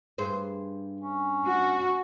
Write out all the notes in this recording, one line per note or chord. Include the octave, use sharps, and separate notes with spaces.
G2 G#4 C5
C#4
F#4